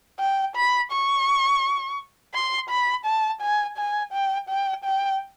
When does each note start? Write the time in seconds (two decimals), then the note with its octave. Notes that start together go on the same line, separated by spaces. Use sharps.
0.20 G5
0.56 B5
0.92 C#6
2.34 C6
2.69 B5
3.06 A5
3.41 G#5
3.78 G#5
4.13 G5
4.49 G5
4.85 G5